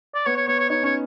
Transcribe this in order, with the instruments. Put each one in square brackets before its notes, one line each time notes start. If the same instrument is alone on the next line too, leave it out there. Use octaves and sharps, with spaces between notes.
[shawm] D5
[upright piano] B3 [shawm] C#5
[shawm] C#5
[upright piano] B3 [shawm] C#5
[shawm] C#5
[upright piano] D#4 [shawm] C#5
[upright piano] C#4 [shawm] C#5